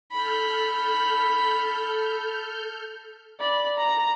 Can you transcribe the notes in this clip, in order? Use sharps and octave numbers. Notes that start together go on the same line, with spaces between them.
A4 B5 F6 G6
D5 B5
A#5